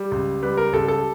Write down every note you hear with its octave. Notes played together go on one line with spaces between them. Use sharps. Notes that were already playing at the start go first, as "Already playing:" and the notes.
Already playing: G3
C#2
G3 B4
A#4
C#2 A4
A4